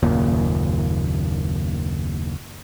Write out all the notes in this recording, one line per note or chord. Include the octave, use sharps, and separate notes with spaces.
F#1 D#2 A#2